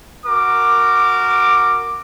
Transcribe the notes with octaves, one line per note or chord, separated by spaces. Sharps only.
F#4 A#4 D6